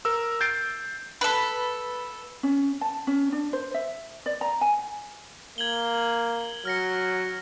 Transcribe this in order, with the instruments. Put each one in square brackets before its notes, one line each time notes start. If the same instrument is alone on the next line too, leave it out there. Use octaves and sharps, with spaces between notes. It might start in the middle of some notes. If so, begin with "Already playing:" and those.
[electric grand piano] A#4 E6
G6 A6 C7 D7
[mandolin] A4 B4
[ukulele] C#4
A5
C#4
D4
C5
E5
D5
A#5
G#5
[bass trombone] A#3 [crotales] G#6 F#7 G7
[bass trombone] F#3 [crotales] F6 A#6 C#7